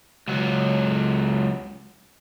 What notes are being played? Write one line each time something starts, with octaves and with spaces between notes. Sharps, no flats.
C#2 F#3